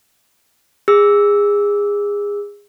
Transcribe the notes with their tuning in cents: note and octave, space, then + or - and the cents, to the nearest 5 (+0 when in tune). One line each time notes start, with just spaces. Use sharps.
G#4 -25 E6 -5